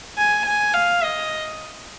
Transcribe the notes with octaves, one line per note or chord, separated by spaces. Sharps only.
G#5
G#5
F5
D#5